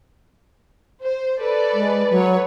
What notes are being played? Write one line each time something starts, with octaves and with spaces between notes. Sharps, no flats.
C5
A4 B4 D5
G#3
F#3 B4 C#5